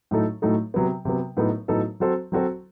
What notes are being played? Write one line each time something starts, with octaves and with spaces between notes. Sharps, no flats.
A2 F#3 A3 D#4 A4
A2 F#3 A3 D#4 A4
C3 F#3 B3
C3 F#3 B3
A2 F#3 B3 D#4 A4
A2 F#3 B3 D#4 A4
F#3 C4 F#4 A4 C5
F#3 C4 F#4 A4 C5